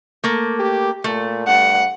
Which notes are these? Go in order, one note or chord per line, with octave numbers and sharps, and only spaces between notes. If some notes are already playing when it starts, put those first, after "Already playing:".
A3 A#3
G4
A#2 A3
G2 F#5